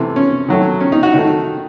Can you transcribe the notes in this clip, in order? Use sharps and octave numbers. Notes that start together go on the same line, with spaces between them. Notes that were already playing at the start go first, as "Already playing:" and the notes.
Already playing: C3 E3 A3
C#4
D#3 F#3 A3
C#4
D#4
F#4
D#3 A3 D#4